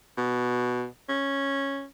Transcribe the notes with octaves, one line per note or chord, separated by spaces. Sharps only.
B2
C#4